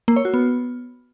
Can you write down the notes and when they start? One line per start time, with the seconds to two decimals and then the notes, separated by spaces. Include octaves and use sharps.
0.08 A#3
0.16 C#5
0.25 F#4
0.34 B3